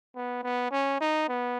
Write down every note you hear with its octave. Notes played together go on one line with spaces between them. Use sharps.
B3
B3
C#4
D#4
B3